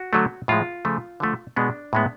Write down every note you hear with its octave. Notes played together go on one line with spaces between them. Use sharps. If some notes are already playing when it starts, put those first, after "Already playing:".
Already playing: F#4
D3 F#3 A3
A2 F3 G#3 F4
C#3 F3 A3
D3 F3 A3
B2 G#3 B3 D4
A2 G#3 B3